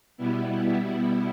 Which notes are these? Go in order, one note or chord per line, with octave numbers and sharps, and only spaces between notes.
B2 G3 B3 E4